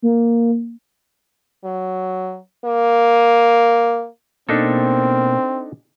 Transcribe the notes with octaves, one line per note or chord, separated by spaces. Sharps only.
A#3
F#3
A#3
B2 A#3 C4 D4 D#4 A4